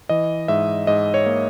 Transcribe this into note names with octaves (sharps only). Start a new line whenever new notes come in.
E3 D#5
G#2 E5
G#2 D#5
C#5
A#3